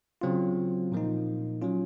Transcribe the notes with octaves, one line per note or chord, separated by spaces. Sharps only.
C#3 F#3 C4 F4
A#2 F3 A#3 D#4
F#3 C#4 F4